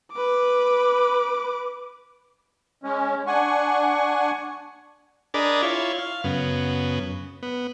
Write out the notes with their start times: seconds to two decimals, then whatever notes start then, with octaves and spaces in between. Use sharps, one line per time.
0.13 B4 D6
2.84 G#3 C#4
3.27 D4 F#5 G#5 C#6
5.34 D4 G#4 A#4 D5 D#5 B5
5.62 E4 F4 C#5
5.99 F5
6.24 F#2 C#3 B3
7.43 B3